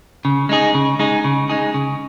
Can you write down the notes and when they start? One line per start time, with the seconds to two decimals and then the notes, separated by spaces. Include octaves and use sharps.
0.25 C#3
0.49 G#3 D#4 G#4
0.74 C#3
0.99 G#3 D#4 G#4
1.24 C#3
1.49 G#3 D#4 G#4
1.74 C#3